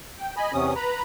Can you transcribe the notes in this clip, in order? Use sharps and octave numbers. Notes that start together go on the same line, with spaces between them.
G5
D#5 G#5 B5
E2 C3 C#4 D#6
B4 A#5 B5